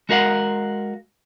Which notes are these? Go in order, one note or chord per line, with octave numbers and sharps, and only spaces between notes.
G#3 F#4 A#4 F5 F#5